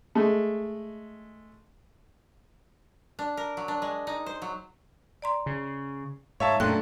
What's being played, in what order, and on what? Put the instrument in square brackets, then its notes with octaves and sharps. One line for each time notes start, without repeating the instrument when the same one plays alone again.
[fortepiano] G#3 A3
[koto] D4
A#4
F#3
D4
G#3
D#4
C5
F#3
[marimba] D5 A#5 C6
[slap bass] C#3
[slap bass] G#2 [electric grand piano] C#5 E5 A5 [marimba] F5
[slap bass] F#2 A#2 [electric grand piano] A3 D4 [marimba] G5 C6 F#6